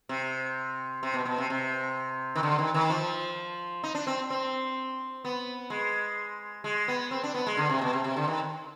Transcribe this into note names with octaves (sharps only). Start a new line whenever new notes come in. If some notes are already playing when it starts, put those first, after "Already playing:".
C3
C3
B2
B2
C3
C3
D#3
D3
D#3
D#3
F3
D#4
D4
C4
C4
B3
G#3
G#3
B3
C4
D4
B3
G#3
D3
C3
B2
C3
C3
D3
D#3